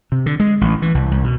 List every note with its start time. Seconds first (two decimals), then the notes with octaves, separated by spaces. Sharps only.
0.12 C3
0.26 D3
0.40 G#3
0.61 A1
0.82 E3
0.95 C2
1.11 C2
1.24 B2